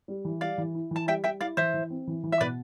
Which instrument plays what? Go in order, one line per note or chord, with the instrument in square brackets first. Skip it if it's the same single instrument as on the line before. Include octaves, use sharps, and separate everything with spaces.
[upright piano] G3
E3
[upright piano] G3 [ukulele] D5 F5
[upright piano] E3
E4
[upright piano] E3 [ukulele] A5
[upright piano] G3 [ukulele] E5 G5
[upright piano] G3 [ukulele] E5 G5
[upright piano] E4 [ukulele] D5 F5
[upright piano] E3 [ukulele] C5 E5
[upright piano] E3
C4
E3
E3
[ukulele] E5
[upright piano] B2 [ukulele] B4 D5